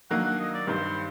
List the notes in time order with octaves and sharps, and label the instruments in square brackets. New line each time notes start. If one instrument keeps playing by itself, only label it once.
[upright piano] D#3 F#3 A#3 D4 [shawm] F#5
[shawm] F#5
D#5
D5
[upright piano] G2 D#3 G3 [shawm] C5